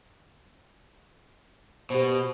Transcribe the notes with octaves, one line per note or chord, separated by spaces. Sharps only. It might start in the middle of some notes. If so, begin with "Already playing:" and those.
B2 G4 C5